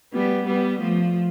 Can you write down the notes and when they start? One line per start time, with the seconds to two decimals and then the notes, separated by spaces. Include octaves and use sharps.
0.13 G3 B3
0.47 G3 B3
0.80 F3 A3